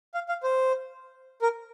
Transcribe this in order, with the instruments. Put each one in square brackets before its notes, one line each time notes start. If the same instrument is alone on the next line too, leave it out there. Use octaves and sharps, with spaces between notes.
[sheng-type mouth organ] F5
F5
C5
A#4